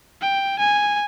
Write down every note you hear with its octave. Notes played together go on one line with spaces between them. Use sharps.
G5
G#5